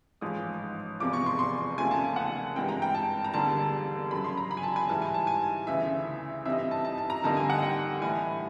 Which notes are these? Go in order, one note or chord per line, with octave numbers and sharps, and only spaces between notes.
A1 G#2 F3 G#3 D#6
E1 E2 C3 F3 D6
C#6
C6
C6
D#2 C#3 F3 A3 C4 G#5
A5
G#5
F#5
G2 E3 G#3 C4 G5
A#5
G5
A5
A#5
E1 D#2 D3 G3 A5
F#2 C#3 F#3 B5
C6
A#5
B5
G#5
A5
G#5
G#2 E3 G3 A5
G#5
A5
G#5
D2 C#3 E3 E5
G2 E3 G3 C4 D#4 E5
D#5
E5
A5
A5
A5
A#5
F2 D3 G3 A#3 D#4 A5
G#5
F#5
G5
A2 E3 G3 G#5